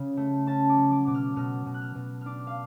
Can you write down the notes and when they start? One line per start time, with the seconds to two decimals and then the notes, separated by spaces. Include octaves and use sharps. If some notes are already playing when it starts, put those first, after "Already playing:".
Already playing: C#3
0.17 A3
0.47 C#4 A5
0.69 D6
0.77 F#3
0.92 D6
1.07 B2 D6
1.14 F6
1.36 B2 F6
1.66 B2
1.74 F#6
1.81 F6
1.95 B2
2.21 D4 D6 F6
2.47 F5